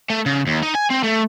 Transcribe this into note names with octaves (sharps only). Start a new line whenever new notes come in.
A3
C#3
D#2
D#4
G#5
C4
A3